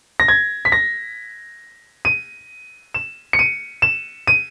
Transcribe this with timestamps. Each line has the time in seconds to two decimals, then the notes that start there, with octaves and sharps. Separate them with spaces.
0.20 A#6
0.28 G#6
0.65 B6
0.72 A#6
2.05 D#7
2.94 E7
3.33 C#7
3.39 D#7
3.82 E7
4.27 D#7